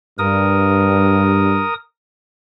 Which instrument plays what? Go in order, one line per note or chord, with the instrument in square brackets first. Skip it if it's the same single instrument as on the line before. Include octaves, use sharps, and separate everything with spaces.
[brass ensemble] G2 [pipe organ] A#4 D#6